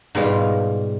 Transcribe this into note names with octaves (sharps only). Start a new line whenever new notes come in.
G#2 B2 G3 F4